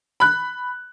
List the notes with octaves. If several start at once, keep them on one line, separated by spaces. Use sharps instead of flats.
B5 F#6